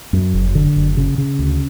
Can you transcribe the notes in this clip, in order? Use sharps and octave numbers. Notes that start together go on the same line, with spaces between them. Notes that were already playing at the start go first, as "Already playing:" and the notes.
F#2
F#1
D3
F#1
C#3
C#3
D2